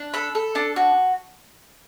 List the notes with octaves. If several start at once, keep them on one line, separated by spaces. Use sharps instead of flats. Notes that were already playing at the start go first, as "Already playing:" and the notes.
Already playing: D4
A4 B5
A4
D4 A5
F#4